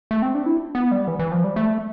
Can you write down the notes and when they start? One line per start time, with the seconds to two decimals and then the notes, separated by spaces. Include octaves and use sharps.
0.11 A3
0.22 C4
0.35 D4
0.46 E4
0.75 B3
0.91 G3
1.08 E3
1.19 E3
1.32 F3
1.44 G3
1.56 A3